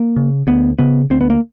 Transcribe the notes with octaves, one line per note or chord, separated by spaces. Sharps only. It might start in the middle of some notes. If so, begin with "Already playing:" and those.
Already playing: A#3
C#3
D2 B3
C#3 B3
D2 C4
B3
A#3